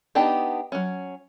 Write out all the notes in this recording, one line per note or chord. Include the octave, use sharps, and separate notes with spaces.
B3 D4 D#4 G4 A5
F#3 C#4